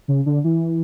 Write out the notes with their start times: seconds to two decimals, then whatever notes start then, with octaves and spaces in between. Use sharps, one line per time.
0.08 C#3
0.26 D3
0.44 E3